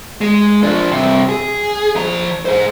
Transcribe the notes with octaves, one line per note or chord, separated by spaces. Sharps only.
G#3
F3 D4
G2 C3
G#4
F3 A#5
G#4 C5